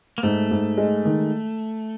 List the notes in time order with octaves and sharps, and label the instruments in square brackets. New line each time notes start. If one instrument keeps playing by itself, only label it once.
[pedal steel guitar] A#3
[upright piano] G#2 [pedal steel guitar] A3
[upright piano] G#2
G#3
D#3